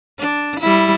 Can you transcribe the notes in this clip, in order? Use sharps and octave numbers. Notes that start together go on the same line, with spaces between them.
D4
G3 E4